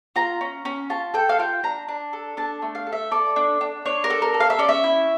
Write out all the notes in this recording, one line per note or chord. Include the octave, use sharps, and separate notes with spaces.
F4 A#5
C#4
C#4
F4 A5
A4 G5
F5
F4 G5
D4 A#5
D4
A4
D4 A5
A3
F5
A4
E5
A4 D5
D4
D4
D4 C#5
A#4
A4
A#4
A4
F5
E5
C#4 D5
E5
E4